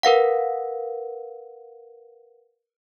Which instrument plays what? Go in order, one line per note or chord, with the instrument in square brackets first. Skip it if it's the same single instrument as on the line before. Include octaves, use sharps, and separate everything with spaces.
[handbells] A#4 B4 F5 F#5